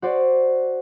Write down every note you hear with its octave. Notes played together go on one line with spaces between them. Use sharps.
F#4 C5 D5